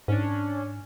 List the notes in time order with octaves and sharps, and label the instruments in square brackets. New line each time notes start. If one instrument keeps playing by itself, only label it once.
[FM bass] G#2 [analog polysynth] C#4 D4